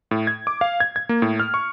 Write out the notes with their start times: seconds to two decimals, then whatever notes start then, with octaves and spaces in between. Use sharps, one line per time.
0.11 A2
0.27 G#6
0.47 D6
0.61 F5
0.80 G#6
0.96 G#6
1.09 A#3
1.22 A2
1.40 F6
1.54 C#6